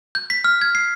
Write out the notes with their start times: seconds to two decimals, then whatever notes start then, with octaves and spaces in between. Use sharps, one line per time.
0.15 G6
0.30 B6
0.44 F6
0.61 G#6
0.75 C7